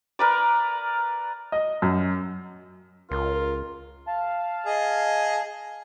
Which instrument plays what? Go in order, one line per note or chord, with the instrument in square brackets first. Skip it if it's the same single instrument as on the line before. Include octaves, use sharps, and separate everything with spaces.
[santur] A#4 B4 D5
[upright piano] D#5
F#2
[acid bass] C#2 [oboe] F4 [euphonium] A#4
[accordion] F5 A5
[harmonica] G#4 D#5